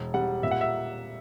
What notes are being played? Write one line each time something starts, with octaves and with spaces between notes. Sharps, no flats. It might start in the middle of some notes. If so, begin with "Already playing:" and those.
Already playing: E1
G3 F#5
A#2 E5
F#5
E5